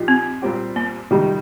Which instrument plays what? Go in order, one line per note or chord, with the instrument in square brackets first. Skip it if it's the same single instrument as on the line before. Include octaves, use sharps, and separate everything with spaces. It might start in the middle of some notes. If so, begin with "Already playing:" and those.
Already playing: [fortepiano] A#2 F3 D#4 G4
[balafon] C4
[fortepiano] A#2 G3 C4 G4
[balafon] A#3
[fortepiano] F2 C3 D#3 G3 D#4